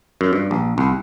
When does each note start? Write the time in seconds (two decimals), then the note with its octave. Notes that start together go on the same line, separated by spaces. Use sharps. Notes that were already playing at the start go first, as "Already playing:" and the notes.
0.21 F#2
0.33 G2
0.51 A#1
0.78 C2